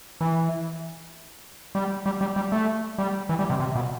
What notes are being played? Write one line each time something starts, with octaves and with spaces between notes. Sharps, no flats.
E3
G3
G3
G3
G3
A3
G3
E3
G3
C3
C3
B2